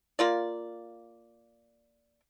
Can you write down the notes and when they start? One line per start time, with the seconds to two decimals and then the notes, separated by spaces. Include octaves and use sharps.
0.19 A#3 F4 D5